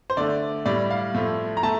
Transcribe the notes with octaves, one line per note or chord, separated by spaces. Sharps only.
C5
D3 A3 D5
A2 G3 D5
F5
A2 F3 A3
A#5
A3 A5